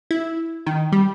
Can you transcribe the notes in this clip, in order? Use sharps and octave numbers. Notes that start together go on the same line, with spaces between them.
E4
D#3
G3